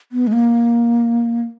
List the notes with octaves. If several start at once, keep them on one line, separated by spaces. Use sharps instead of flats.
B3
G#3
A#3